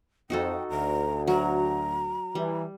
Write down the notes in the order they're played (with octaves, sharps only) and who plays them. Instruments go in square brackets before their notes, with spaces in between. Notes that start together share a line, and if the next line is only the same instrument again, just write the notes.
[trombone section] F2 [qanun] D#4 F#4 A4 [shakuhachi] G5
[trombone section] D2 [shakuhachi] A#5
[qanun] F#3 [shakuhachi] A#5
[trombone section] E3 [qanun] G3